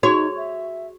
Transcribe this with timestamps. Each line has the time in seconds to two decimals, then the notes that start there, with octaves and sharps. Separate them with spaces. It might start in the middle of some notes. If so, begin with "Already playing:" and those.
0.03 D#4 F#4 G#4 C#5
0.37 E5